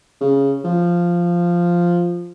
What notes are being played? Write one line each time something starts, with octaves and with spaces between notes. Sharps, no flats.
C#3
F3